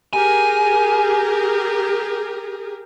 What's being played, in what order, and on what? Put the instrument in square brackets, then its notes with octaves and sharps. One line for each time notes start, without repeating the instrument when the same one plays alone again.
[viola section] G4 G#4 A#4 [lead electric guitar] G#5